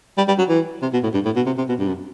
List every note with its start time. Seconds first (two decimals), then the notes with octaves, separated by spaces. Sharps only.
0.17 G3
0.28 G3
0.38 F#3
0.49 E3
0.82 C3
0.93 B2
1.03 A2
1.14 G2
1.25 A2
1.36 B2
1.46 C3
1.58 C3
1.69 B2
1.79 G2
1.88 F#2